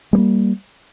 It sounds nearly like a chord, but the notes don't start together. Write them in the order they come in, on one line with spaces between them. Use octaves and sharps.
G#3 G3 A#3